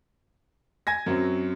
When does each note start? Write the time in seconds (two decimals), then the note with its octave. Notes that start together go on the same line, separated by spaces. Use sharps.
0.87 G#5 G#6 A#6
1.06 F#2 F#3 C4